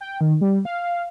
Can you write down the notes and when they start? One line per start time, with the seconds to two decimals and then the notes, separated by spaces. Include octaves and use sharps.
0.01 G5
0.21 D#3
0.41 G3
0.65 F5